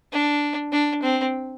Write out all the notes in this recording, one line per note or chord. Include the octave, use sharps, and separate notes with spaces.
D4
D4
C4